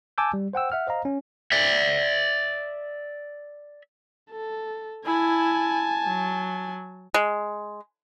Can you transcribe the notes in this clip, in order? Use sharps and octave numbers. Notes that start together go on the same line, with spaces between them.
G#5 A5 D6 E6 G6
G3
C5 F#5 G5 E6
E5 F#5 F6
C5 D#5 F5 A#5
C#4
D5 E5
A4
E4 G#5 A5
F#3
G#3